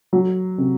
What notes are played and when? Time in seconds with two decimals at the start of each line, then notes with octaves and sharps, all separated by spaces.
0.13 F#3
0.58 C3